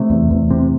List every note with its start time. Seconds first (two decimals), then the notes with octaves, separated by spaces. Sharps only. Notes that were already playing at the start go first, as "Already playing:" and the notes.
Already playing: C3 A3
0.10 E2
0.30 E2
0.51 C3